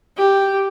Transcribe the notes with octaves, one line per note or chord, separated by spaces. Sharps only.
G4